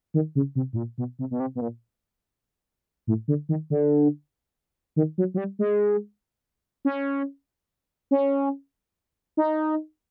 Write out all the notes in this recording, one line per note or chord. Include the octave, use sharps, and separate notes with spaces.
D#3
C#3
C3
A2
A#2
B2
C3
B2
C3
B2
A#2
A2
D3
D#3
D3
D#3
F#3
F#3
G3
G#3
C#4
C#4
D#4